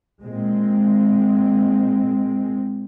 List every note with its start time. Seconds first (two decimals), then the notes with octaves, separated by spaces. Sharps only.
0.22 A#2 G#3 C4